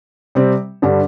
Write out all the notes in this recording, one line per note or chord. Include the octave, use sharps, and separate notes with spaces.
C3 G3 C4
G2 D3 G3 D4